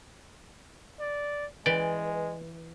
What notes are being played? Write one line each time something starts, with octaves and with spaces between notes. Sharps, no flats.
D5
E3 G#3 D5 G5